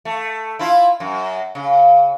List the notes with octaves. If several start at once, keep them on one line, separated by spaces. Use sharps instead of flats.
A3
E4 F4
F#2
C#3